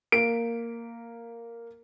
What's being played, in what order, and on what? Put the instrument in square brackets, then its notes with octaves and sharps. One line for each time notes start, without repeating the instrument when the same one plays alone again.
[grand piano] A#3 D7